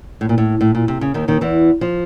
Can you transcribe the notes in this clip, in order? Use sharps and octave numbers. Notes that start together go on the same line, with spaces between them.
A2
A#2
A2
A2
A#2
C3
C#3
D#2 D#3
D#2 D#3
E2 E3
F3